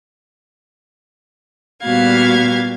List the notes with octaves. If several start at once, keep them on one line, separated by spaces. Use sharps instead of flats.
A#2 G3 B3 F#4 F5 G#6